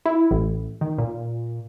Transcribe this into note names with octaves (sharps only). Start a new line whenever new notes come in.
E4
A1
D#3
A#2